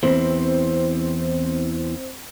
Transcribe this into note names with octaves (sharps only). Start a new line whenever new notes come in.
E2 G#2 E3 C4